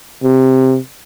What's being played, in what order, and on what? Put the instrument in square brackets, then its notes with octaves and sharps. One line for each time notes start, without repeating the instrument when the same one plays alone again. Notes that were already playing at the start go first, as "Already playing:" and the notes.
[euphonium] C3